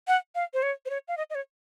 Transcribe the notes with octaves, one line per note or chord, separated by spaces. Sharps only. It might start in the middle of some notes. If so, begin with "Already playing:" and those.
F#5
F5
C5
C#5
C5
C#5
F5
D#5
D#5
C#5